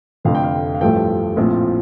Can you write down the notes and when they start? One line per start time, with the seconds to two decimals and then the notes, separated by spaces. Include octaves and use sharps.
0.25 F1 F2 D3 A3 F5
0.35 G5
0.43 F5
0.75 F5
0.81 A1 G2 F3 A3 G5
1.37 A#1 A2 F3 C4 F4